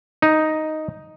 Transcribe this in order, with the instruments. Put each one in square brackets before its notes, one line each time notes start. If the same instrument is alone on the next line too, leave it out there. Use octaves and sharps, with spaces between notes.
[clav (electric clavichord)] D#4